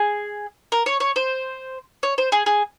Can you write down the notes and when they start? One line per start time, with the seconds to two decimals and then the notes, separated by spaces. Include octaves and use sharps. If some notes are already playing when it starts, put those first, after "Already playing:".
Already playing: G#4
0.72 A#4
0.86 C#5
1.00 C#5
1.16 C5
2.03 C#5
2.18 C5
2.32 G#4
2.46 G#4